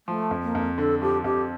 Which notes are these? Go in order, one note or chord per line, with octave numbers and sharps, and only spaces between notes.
F3 A3
F2
A#3
F2
D3 A4
F3 G4
F2 G4